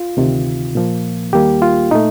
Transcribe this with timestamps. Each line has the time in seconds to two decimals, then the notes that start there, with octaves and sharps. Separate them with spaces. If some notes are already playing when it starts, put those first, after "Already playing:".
Already playing: F4
0.17 D2 C3 D#3
0.75 A#2 F3 A#3
1.33 D#2 D#3 G3 A#3 G4
1.62 F4
1.91 A#2 A3 D#4